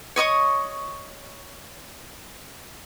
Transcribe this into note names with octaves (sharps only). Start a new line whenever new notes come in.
C#5 D#5 C#6 D#6